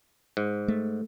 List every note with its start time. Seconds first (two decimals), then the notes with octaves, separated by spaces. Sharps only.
0.37 G#2
0.68 A3